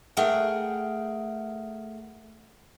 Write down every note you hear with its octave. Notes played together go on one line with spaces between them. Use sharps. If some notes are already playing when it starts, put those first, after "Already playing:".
A3 G#4 A#4 F#5 G5